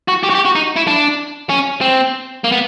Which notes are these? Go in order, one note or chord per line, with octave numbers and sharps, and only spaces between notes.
F#4
G4
F#4
G4
F#4
D#4
E4
D4
C#4
C4
A#3
B3